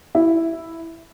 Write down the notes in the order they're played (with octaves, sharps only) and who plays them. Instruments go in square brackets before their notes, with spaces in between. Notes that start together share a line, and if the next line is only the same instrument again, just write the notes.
[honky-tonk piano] E4